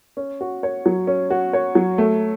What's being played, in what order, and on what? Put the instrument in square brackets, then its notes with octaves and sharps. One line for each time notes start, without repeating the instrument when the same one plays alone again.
[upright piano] C#4
F#4
C#5
F#3
C#4
F#4
C#5
F#3
A3